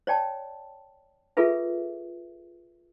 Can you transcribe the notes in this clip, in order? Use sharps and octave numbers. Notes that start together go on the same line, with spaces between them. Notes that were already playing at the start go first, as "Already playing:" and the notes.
C#5 D5 G5 A5
F4 G#4 A4 B4 E5